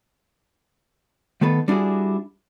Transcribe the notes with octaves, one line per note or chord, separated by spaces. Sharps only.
D#3 A3 B3 A4 B4
G3 D4 E4 F#4 G#4